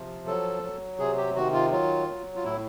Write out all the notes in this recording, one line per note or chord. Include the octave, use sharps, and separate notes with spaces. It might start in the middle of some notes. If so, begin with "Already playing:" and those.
Already playing: C3 F3
F#3 A4
F#3
C3 G#4
G4
D#3 F#4
F4
F#3 F4
F#3
F4
A2 E4